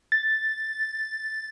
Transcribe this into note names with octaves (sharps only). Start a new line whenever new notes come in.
A6